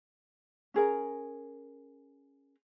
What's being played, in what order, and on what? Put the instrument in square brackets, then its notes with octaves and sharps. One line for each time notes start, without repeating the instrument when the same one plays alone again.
[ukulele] C#4 G#4 A#4 A#5